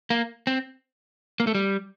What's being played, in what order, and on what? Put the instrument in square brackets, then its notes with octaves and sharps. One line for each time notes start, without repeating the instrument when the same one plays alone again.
[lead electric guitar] A#3
C4
A#3
A3
G3